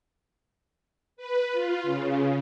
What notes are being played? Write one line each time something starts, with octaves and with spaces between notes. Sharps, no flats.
B4
F4
C#3